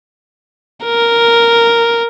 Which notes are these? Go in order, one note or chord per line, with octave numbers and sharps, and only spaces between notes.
A#4